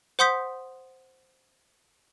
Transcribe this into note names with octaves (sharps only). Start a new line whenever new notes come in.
C5 F#5 C6 D#6 G6 B6